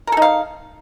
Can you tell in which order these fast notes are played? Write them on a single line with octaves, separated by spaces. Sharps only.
A#4 A4 D#4 F5